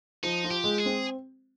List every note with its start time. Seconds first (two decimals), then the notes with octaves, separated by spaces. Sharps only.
0.23 F3 D#4
0.44 F4
0.51 G4
0.64 G#3
0.78 G#4
0.86 C4